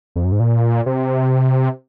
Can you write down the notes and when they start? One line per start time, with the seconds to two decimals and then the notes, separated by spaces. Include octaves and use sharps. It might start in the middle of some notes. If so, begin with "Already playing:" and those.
0.16 F2
0.25 F#2
0.32 G#2
0.40 A#2
0.86 C3